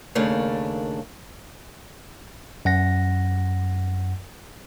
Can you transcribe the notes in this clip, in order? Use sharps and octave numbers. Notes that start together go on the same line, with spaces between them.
D#2 C#3 A3 A#3 D4
F#2 F#5 A#6